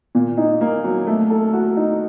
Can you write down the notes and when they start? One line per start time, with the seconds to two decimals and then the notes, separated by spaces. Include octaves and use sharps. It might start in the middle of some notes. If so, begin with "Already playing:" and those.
0.15 A#2
0.37 D#4
0.61 A#3
0.84 F#3
1.07 A3
1.30 A4
1.53 F#4
1.77 D#4